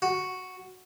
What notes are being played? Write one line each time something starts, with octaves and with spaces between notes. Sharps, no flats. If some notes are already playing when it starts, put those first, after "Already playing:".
F#4